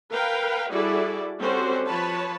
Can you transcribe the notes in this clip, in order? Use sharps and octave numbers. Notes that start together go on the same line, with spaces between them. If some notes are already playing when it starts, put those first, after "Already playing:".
A#4 B4 F5 G5
G3 E4 F#4 G#4 A4 D5
G3 C4 C#4 F#4 A4 C5
F3 B4 C#5 A5 B5